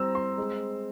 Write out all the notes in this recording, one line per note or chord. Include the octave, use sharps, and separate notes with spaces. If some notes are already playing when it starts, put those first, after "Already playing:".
Already playing: G3 C4 A#5 E6
C6
G#3